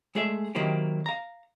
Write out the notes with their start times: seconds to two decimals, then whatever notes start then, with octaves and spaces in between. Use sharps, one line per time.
0.15 G#3 A3 G#4 D5 E5
0.55 D#3 F#3 A#3 C4 E4 G4
1.06 F5 A#5